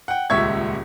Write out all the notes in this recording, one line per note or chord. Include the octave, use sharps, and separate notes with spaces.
F#5 G5
D#1 C#2 E5 C#6 G#6